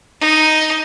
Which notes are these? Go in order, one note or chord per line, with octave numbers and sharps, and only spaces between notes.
D#4